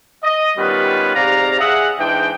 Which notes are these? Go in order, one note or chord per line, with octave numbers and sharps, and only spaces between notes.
D#5
D#3 G3 B3 C#4 F4 B4
G#2 C3 D5 F5 A#5
G#4 E5 F#5
G#2 E3 G#3 D4 G5